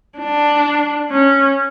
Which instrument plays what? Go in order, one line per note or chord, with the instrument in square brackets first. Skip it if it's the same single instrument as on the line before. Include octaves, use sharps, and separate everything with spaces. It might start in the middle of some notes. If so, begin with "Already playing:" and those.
[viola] D4
C#4